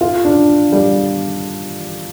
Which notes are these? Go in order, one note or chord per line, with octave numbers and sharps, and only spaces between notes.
F4
D4
G3